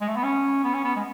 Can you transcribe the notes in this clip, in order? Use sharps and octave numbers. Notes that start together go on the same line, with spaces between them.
G#3
A3
B3
C#4
B3
C#4
B3
G#3